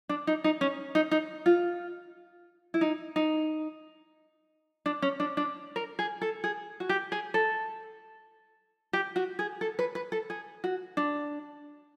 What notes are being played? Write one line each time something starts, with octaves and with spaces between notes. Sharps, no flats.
D4
D#4
D#4
C#4
D#4
D#4
F4
E4
D#4
D#4
D4
C#4
D4
D4
A#4
G#4
A4
G#4
F#4
G4
G#4
A4
G4
F#4
G#4
A4
B4
B4
A4
G#4
F#4
D4